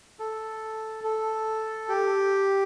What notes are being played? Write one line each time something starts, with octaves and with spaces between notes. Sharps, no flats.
A4
A4
G4